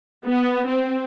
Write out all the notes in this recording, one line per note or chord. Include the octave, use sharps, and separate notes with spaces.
B3
C4